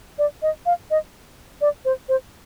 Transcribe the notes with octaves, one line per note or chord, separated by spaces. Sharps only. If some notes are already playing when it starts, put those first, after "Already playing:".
D5
D#5
F5
D#5
D5
C5
C5